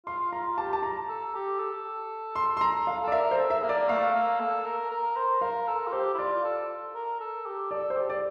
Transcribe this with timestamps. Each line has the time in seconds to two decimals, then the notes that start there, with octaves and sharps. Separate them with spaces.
0.07 F4 C6
0.32 F4 A#5
0.58 G4 A5
0.73 A5
0.83 A#5
1.09 A4
1.34 G4
1.59 A4
2.36 C6
2.57 C6
2.61 A#5
2.87 F5
3.02 A4
3.07 D5
3.12 A#4 E5
3.31 C5
3.38 A4
3.50 E5
3.63 A#3
3.69 D5
3.89 A3 F5
4.14 A#3
4.40 A4
4.65 A#4
4.91 A#4
5.16 C5
5.41 A#4 F5
5.67 A4
5.87 F4
5.92 G4 C5
6.14 E4
6.18 F4 D5
6.44 A4
6.95 A#4
7.20 A4
7.46 G4
7.71 A4 D5
7.90 C5
7.97 G4
8.10 D5